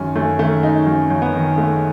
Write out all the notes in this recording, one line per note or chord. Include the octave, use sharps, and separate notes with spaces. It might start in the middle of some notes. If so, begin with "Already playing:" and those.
Already playing: F#2 D#3 G#3 C#4
F#2 A3
D#3 A3
G#3 D#4
F#2
F#2
B3
D#3
G#3 A3